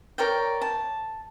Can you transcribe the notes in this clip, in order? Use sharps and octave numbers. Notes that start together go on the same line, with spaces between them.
A#4 C#5 D5 G5
A5